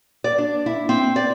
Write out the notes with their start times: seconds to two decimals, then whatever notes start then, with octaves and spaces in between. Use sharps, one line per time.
0.24 D5
0.38 D4
0.66 E4
0.89 C4
1.16 D5